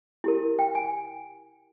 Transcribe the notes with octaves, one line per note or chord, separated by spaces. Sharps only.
E4 G4 A#4
G5
G#5